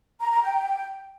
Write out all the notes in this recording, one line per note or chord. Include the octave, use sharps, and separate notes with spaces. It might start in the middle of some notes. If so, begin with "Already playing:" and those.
A#5
A#5
G5